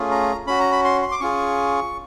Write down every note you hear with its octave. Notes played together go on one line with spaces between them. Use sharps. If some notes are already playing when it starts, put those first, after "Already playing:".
Already playing: A3 C#4 F4 G#4
A#5
C#4 F#4 B5
A#5
B5
C6
C6
D6
C#4 F4 G#4 C#6